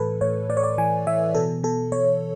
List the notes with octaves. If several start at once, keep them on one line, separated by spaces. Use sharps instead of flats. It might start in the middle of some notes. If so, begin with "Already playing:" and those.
Already playing: A2 E3 A4 B4
A2 C#5
A2 D5
C#5
D5
E3 G#5
E3 E5
B2 A4
B2 A4
B2 C#5